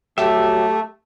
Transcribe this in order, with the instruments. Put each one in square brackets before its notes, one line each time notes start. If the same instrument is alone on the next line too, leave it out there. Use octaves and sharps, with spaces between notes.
[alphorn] F#3 [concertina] A3 [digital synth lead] G4 [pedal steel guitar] E5